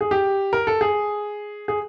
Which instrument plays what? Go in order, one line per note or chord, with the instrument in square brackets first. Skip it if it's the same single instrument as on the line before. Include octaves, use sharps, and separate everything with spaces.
[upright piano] G#4
G4
A#4
A4
G#4
G#4